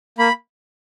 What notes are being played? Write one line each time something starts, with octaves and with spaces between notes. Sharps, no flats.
A#3 B5